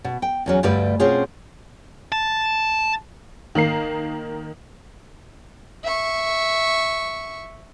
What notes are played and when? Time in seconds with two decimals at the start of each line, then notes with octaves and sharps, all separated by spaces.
0.04 B2
0.22 G5
0.46 E2 F#3 C#4
0.63 D2 G2 G3 A3 B4 D5
0.99 B2 C4 C#4 F4 G#4 C#5
2.12 A5
3.55 D#3 A#3 A#4 C7
5.83 E5 C#6